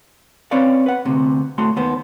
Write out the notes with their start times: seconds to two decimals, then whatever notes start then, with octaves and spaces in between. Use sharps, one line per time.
0.51 C4 C#4 B4 C#5 D5 F5
0.86 B4 F#5
1.05 D2 C3
1.58 A2 A3 F#4 C6
1.76 D#2 B3 C5